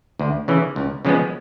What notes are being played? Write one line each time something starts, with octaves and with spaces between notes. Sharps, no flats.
D2
C#3 E3
C#2
C#3 F3 G#3 B3